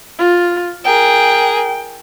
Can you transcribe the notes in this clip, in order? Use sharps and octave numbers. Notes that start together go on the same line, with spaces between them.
F4
G#4 A#4 G5